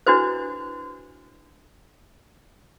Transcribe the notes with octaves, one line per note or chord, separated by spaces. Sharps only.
D4 E4 F#4 B4 C5